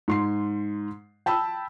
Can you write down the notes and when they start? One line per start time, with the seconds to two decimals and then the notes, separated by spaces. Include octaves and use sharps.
0.08 G#2 C6 C7
1.26 G5 A5 B5 E6